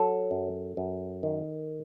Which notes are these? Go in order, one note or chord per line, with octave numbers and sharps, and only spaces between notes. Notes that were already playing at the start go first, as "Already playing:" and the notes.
Already playing: F#3 A4
F#2
F#2
D#3